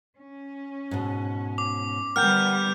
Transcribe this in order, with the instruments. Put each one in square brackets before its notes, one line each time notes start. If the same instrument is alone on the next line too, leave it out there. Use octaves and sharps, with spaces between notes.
[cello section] C#4
[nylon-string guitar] G#2 B2
[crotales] D6
[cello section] D3 G3 B3 [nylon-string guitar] A#4 F#5 G5 [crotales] F6 G6